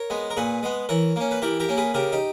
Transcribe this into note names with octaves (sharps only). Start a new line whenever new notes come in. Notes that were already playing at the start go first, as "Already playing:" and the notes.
Already playing: A#4 C#5
G#3 B3
A#4
A#2 G#4 B4
G#3 B3
E3 A#4 C#5
A#3 C#4
B4
E3 G4 A#4
G4 A#4
A#3 C#4
G#4 B4
C#3 G4 A#4
D#4 G4